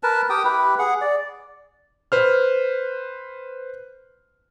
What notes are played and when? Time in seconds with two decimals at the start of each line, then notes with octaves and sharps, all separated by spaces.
0.03 A#4 B4 A5
0.30 G4 G5 D#6
0.45 E4 G4 B4
0.79 G#4 F#5
1.01 D5
2.12 B4 C5 F6